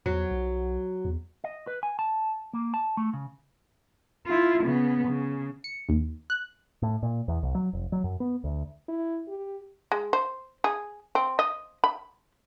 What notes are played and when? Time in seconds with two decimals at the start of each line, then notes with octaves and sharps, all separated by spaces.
0.06 E2 F#3
0.31 B1
1.05 E2
1.44 D#5
1.67 B4
1.83 G#5
1.99 A5
2.53 A#3
2.74 A5
2.97 A3
3.13 C#3
4.26 E4 F4
4.63 C#3 B3
5.08 C#3
5.64 C#7
5.89 D#2
6.30 F#6
6.82 A2
7.03 A#2
7.28 E2
7.43 C2
7.55 F#3
7.73 F1
7.92 F#3
8.04 F#2
8.20 B3
8.44 D2
8.88 E4
9.28 G4
9.92 G#3
10.13 C5
10.64 G#4
11.15 C4
11.39 D#5
11.84 B5